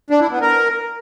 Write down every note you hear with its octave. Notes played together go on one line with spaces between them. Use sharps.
D4
E4
B3
A#4